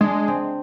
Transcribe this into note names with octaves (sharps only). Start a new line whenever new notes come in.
G#3 D4
C4